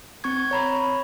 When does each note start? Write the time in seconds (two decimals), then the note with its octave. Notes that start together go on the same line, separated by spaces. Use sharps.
0.24 C4 C#6 G#6
0.51 C#5 A#5 B5